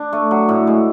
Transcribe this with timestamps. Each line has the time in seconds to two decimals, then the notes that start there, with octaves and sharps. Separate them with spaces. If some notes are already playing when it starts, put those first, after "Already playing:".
Already playing: D4
0.13 A3
0.31 F#3
0.49 A2
0.67 G#3